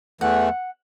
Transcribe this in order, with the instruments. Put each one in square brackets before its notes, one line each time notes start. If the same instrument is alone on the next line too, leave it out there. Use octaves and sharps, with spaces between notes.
[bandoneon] E2 E3 A3 [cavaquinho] F#5